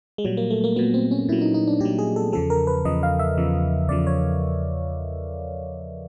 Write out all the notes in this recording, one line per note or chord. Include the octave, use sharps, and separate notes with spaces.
G#3
A#2 F#3 G3
A#3
A3
A#3
A#2 F#3 B3
C4
C#4
A#2 F#3 E4
D#4
D#4
D4
A#2 F#3 G4
G#4
A4
E2 C#3 F3 A4
A#4
B4
E2 C#3 F3 D#5
F5
E5
E2 C#3 F3
E2 C#3 F3 D5
C#5